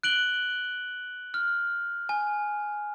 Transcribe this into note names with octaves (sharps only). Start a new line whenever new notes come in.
F#6 D7 F#7 G7
F6
G#5